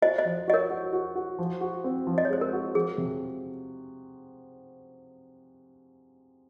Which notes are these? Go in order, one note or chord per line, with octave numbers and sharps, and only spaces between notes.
F#4 C5 D#5
C5 D#5
F3
F#4 D#5
A#4 C#5
F#4
F#4
F#4
F3
F#4
C4
F3
D#5
C#5
G#3 C5
A#4
F#4
F3 G#4
C3